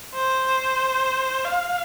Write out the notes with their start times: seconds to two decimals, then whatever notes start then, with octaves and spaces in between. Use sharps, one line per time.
0.14 C5
1.45 F5